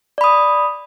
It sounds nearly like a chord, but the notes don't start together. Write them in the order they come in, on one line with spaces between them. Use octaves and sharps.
D5 B5 D#6